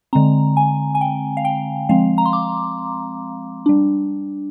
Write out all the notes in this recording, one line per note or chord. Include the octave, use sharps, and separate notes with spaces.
D3 G#3 C4 A#5
G#5
G#5
G5
F5
G5
F3 G#3 C4 F5
A#5
C6
D6
G3 D4